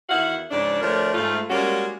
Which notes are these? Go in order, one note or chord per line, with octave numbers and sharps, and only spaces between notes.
E2 D#3 E4 F#4 F5 F#5
G#2 C#3 F3 D4
D2 F3 A3 D4 A#4 C#5
G#2 A3 F4
G3 G#3 A#3 C#4 F4 F#4